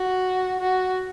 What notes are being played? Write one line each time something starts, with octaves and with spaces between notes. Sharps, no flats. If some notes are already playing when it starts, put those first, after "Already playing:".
Already playing: F#4
F#4